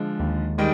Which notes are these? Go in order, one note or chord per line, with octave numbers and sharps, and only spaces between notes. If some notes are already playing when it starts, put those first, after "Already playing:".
Already playing: D3 F3 G#3
D#2
D#3 G3 G#3